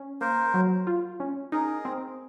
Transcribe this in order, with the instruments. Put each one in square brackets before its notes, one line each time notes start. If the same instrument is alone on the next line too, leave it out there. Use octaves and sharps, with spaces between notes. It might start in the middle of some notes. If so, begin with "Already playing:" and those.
Already playing: [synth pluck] C#4
[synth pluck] A#3 [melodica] A#4 C5
[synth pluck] F#3
F4
C#4
[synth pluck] D#4 [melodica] G#4 A#4
[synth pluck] C4